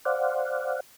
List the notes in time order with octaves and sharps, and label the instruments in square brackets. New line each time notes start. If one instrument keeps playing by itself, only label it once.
[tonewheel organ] C5 D5 F5 F#5